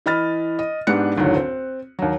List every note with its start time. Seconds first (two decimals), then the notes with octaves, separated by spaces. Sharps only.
0.06 E3 D#5 B5 F6 A6
0.59 D#5
0.87 G#2 B3 D4 G4 F#6 C#7
1.17 F#1 D2 A2 D#3 F#3
1.37 C4
1.99 D#2 F#3